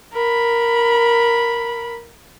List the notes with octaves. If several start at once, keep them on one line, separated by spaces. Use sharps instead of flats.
A#4 B5